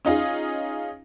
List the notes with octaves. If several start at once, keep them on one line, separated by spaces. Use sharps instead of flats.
C#4 D#4 F4 G#4